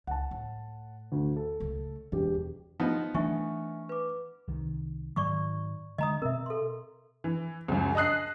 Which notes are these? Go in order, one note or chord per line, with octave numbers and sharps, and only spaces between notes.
C#2 F#5 A5
A2
D2
A4
C#2 A3
E1 C#4 G4
F3 B3 D#4
E3 A3 D4 E5 G#5 C#6
B4 D6
C2 D#3
G#2 D#3 F#3 D5 C#6 D6
D3 G#3 D#5 A#5 D#6
B2 C4 A#4 E5
A4 C6
E3
C#2 F#2
D#5 A5 D#6 F#6 C7